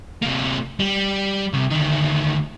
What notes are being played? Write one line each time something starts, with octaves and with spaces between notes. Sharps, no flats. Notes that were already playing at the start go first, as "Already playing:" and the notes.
C3 A#3
G3
C2 C3
D2 D#3